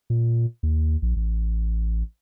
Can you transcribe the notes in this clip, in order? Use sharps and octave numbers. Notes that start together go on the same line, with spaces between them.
A#2
D#2
A#1
A1